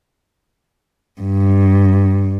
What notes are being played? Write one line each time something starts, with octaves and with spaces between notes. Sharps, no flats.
G2